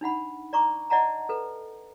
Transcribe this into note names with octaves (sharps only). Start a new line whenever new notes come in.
D4 D#4 F#5 B5
D5 A#5 C#6 D6
D5 D#5 F#5 A5 A#5
A4 B4